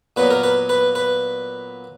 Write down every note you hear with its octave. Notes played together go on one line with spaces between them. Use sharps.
A#2 F#3 B3 B4
A#4
B4
B4
B4